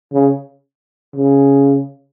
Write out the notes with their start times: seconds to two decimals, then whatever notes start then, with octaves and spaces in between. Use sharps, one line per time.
0.12 C#3
1.16 C#3